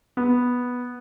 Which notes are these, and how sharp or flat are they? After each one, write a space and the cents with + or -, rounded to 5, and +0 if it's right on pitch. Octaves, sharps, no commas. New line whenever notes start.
B3 -5